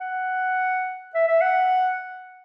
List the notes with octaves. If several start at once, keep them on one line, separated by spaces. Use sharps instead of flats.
F#5
E5
E5
F#5